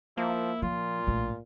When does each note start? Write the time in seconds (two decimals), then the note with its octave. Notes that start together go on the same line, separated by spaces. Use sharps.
0.17 F3 A#3 E4
0.62 A#2 F3 F4
1.07 A#1 A2